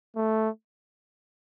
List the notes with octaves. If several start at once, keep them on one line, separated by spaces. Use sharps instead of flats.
A3